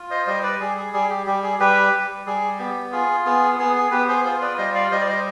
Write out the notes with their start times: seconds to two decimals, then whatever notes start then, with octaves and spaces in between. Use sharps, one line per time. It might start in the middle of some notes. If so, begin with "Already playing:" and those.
Already playing: F4
0.10 C5 D#5
0.27 G3 C5 D#5
0.43 B4 D5
0.60 G3 G#4
0.77 G#4
0.93 G3 G#4
1.10 G4
1.26 G3 G4
1.43 G#4
1.59 G3 G4 B4
1.92 G3
2.26 G3 G#4
2.59 B3 G4
2.92 F4 G#4
3.26 B3 G#4
3.59 B3 G#4
3.75 G#4
3.91 B3 G4 B4
4.08 G#4 C5
4.24 F4 G#4 C5
4.41 B4 D5
4.58 G3 C5 D#5
4.74 D5 F5
4.91 G3 C5 D#5
5.01 D5
5.08 C5 D#5